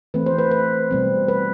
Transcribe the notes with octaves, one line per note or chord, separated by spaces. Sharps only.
E3 A3 C4 B4
C5
B4
B4
B2 G3 C4
B4